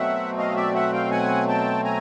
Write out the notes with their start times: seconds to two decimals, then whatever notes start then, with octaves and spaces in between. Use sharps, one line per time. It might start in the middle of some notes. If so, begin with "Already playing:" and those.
Already playing: B2 F#3 A3 C4 E5 F#5
0.38 D#5 F5
0.56 D5 E5
0.74 E5 F#5
0.93 F5 G5
1.11 F#5 G#5
1.48 G5 A5
1.84 G#5 A#5